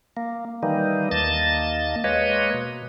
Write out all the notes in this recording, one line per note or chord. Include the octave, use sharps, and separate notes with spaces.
A#3
D#3 E3 G3 A#3 D#4
D#2 A#3 D#5 A5 A6
G#3 A#3 B4 C#5 D#5
B2